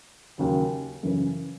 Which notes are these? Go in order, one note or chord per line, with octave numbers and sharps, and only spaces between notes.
D#2 C#3 F#3
F#2 C#3 E3